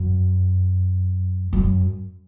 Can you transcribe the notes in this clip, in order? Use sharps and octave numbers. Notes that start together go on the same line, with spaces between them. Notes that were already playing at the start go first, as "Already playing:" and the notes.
Already playing: F#2
F#2